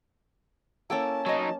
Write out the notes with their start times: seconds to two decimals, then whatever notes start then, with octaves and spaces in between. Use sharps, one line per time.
0.90 A#3 C#4 E4 A4 G5 A5
1.26 F#3 D#4 C#5 D#5